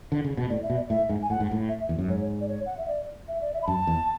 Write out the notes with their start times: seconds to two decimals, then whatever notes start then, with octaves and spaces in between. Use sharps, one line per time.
0.12 D3
0.24 C#3
0.37 B2
0.49 A2 D5
0.63 E5
0.70 B2
0.76 D5
0.89 A2 E5
1.09 G#2
1.22 G#5
1.30 A2 F#5
1.40 G#2
1.51 A2
1.68 E5
1.89 E2
1.98 F#2
2.08 G#2 C#5
2.41 D5
2.48 C#5
2.66 F#5
2.77 E5
2.88 D5
3.28 E5
3.41 D5
3.54 E5
3.63 B5
3.67 F#2 A5
3.87 E2